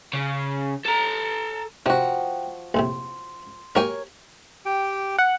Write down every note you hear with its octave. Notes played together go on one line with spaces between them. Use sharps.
C#3
A4 A#5
C3 F3 F#4 G5
A#1 A2 C3 C6
F#3 A#3 G4 A#4 C#5 G#5
G4 G5
F#5